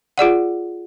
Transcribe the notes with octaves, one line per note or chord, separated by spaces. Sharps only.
F4 G#4 D5 F#5